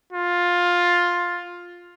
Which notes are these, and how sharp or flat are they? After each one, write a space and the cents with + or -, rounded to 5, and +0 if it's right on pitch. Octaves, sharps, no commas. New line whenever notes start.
F4 +10